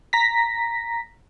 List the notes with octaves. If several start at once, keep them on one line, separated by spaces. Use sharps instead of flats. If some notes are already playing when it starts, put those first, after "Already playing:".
A#5 A#6 B6